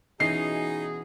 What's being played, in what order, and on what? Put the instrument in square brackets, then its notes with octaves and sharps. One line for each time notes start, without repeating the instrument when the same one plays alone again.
[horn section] B2 F#4 G#4 [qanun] E3 C#4 D#5 [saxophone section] D#4 [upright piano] C7